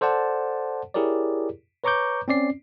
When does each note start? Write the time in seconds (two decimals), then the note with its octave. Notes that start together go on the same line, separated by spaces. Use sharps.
0.01 A4 C5 D5 F#5 A5
0.94 E4 G4 G#4 A#4 C#5 D5
1.84 B4 C#5 A#5 C#6 D6 G6
2.28 C4 C#4 D5 C7